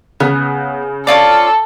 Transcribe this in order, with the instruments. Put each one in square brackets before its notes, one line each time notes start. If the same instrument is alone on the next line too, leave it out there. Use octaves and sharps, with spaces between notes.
[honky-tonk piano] C#3 [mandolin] B3
[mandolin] C#4 F4 D5 [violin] A4